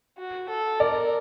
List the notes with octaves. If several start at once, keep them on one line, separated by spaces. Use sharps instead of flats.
F#4
A4
A#4 D5